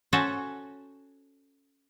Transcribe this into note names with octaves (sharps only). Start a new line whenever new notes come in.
C#4 F#4 A4 C5 C#5 F#5